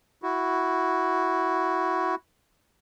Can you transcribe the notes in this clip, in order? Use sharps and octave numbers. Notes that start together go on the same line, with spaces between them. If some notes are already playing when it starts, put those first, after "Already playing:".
E4 F#4